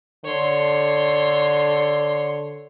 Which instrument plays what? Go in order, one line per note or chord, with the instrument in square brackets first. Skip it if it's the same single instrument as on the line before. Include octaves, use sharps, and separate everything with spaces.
[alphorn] D3 [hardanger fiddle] C#5 C6